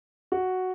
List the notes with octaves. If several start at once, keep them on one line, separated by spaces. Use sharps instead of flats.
F#4